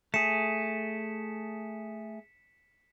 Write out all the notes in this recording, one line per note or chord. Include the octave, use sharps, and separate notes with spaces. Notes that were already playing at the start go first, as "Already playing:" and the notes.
A3 G#4 B6 C#7 E7